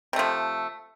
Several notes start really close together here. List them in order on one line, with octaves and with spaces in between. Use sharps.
C3 A3 F3